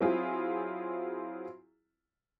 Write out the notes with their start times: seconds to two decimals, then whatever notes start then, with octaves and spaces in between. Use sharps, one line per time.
0.01 F#3 C4 E4 F4 G#4